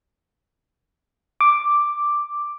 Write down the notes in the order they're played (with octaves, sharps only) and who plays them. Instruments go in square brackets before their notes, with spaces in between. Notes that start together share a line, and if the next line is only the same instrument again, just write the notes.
[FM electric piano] D6